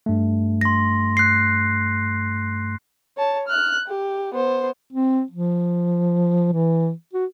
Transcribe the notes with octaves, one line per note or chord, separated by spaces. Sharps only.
G2 A3
C6 A#6
F#6 C7
C#5 A5
F6 F#6
G4
B3 C5
C4
F3
E3
F#4